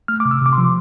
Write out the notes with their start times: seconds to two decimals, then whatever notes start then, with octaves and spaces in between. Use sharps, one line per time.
0.08 A3 F6
0.20 D6
0.26 C3
0.31 E6
0.41 C3 D6
0.53 C6
0.58 F3